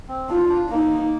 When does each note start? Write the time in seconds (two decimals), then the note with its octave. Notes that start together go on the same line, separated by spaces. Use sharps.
0.08 C4
0.29 D4 F4
0.49 D4
0.70 A#3 D#4